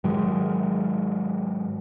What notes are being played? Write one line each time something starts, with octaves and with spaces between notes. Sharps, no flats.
G#2 D#3 F#3 G#3